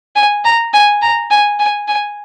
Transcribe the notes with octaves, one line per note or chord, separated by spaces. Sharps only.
G#5
A#5
G#5
A#5
G#5
G#5
G#5